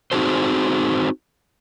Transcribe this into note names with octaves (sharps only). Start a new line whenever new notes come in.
C4 D#4 F#4 G#4 A4 C5